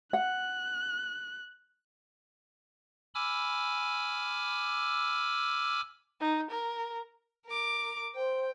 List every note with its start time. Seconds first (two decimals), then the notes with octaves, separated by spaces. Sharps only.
0.13 F#5 F#6
3.15 G#5 B5 D6 E6 F6
6.21 D#4
6.51 A#4
7.46 A#4 D6
8.15 C5 G5